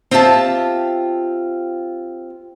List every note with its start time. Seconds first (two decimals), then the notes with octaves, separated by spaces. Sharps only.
0.11 C4 F4 G4 E5 G5 A5